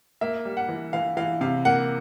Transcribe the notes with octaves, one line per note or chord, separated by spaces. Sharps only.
A#3 E5
G3
F#5
E3
E3 F5
E3 F5
C3 F5
A#3 F#5